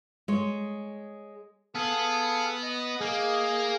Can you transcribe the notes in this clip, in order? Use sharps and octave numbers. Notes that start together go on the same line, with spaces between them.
G#3 C#5
B3 G#4 A4 F5
D#5
A#3 G#4